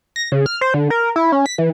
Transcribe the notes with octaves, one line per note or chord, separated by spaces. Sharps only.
A#6
C#3
F6
C5
D3
A#4
E4
C#4
B6
E3